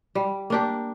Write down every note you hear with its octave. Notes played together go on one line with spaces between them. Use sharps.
G3
A#3 D4 G4